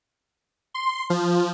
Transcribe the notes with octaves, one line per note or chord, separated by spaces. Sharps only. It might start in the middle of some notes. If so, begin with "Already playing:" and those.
C6
F3